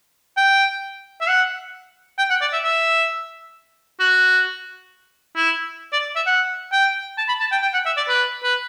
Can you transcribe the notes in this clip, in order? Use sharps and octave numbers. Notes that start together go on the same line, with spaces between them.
G5
E5
F#5
G5
F#5
D5
E5
E5
F#4
E4
D5
E5
F#5
G5
A5
B5
A5
G5
G5
F#5
E5
D5
B4
B4